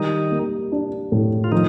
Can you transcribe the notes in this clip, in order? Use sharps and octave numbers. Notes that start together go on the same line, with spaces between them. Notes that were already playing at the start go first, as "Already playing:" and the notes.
Already playing: D#3 G3 D#4
A#3
D4
A2
F4
D#3 F3 D#4